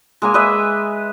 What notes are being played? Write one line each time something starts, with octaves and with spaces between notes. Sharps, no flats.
G#3 A#3 G#5
B4 D#5 E5